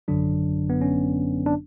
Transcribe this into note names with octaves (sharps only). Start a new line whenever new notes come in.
G#1 F#2 D3 F#3 D4
B3
C#4
D4